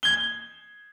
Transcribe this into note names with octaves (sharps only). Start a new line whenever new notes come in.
G#6 G7